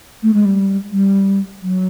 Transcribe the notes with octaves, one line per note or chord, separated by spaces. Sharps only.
A3
G#3
G3
G3
F#3